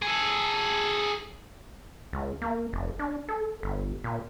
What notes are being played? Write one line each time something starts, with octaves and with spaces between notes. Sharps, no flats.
G#4 A4
C#2
A#3
F1
D4
A4
G1
A#2